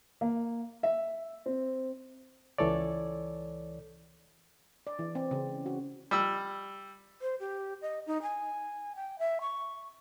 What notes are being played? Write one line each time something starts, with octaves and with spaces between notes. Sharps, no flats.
A#3
E5
C4
C#2 E3 A4 C#5 D5
D5
E3
C4
C#3
F#4
G3 E6
C5
G4
D#5
D#4
G#5
G5
E5
C#6